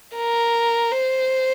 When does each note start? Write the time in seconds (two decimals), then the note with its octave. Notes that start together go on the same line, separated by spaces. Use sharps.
0.15 A#4
0.91 C5